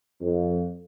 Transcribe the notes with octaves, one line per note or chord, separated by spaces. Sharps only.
F2